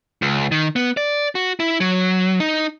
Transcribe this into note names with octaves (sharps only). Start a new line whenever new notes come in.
C#2
D#3
B3
D5
F#4
E4
F#3
D#4